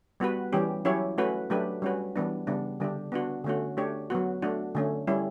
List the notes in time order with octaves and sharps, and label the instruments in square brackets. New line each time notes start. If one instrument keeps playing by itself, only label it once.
[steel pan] G3 B3 F#4 B4
E3 G3 C#4 G4
F#3 C#4 E4 G4 C#5
A3 C#4 F#4 B4
F#3 A3 D4 G4 B4
G3 C#4 F#4 B4
E3 G3 B3 D4
C#3 G3 B3 D4
D3 G3 D4 G4
B3 D4 F#4
D3 A3 C#4 F#4
A3 D4 G4 C#5
F#3 B3 F#4
A3 D4 F#4
D3 A3 C#4
G3 C#4 E4